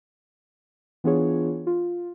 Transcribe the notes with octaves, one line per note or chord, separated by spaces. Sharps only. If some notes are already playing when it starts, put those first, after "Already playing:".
E3 B3 D4 F4 G#4 C#5
F4